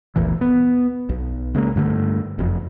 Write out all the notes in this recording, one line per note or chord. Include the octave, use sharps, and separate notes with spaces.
G1 D2 A#2 E3
B3
B1
C#3 G#3 A#3
G2 D3 A3
F#1 F2